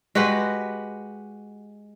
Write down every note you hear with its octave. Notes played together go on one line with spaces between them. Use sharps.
G#3 F#4 G4 B4